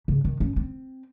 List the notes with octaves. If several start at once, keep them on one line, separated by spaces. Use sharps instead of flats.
C#3
D#3
C#4
C4